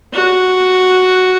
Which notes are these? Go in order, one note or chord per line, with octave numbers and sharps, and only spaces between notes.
F#4